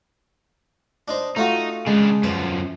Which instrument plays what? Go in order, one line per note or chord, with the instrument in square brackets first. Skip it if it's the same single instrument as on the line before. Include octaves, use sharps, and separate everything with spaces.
[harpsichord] D4 D#4 C5
[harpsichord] A3 F4 F#4 [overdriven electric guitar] D#4
[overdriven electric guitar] C#3 D4 [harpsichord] G#3
[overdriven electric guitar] F#2 F3 [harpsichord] B4